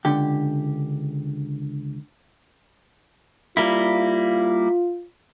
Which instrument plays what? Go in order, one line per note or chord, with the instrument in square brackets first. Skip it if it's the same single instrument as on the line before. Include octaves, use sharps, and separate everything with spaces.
[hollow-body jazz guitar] C#2 D3 G4
[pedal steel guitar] G3 A#3 E4 [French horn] F4